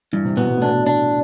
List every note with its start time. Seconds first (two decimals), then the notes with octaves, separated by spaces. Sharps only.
0.13 G2 E3
0.25 C3
0.37 B2 B3
0.49 B2
0.57 A2
0.62 B2 D4
0.87 D4